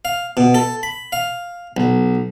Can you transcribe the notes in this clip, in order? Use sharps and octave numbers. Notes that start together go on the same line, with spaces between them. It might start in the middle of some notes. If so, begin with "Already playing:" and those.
F5
B2
A4
B5
F5
B1